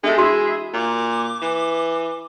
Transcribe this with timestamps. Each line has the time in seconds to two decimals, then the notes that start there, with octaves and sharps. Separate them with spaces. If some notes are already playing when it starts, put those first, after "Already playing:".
0.04 G#3 D4 G4 A4 E5
0.18 E4 F#4 G#4 E5 C6
0.73 A#2 D6
1.42 E3